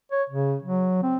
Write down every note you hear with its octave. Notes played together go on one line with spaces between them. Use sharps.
C#5
C#3
F#3
C4